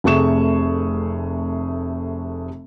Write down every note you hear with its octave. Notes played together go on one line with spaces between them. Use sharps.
F1 C3 A3 G#4 C#6 E7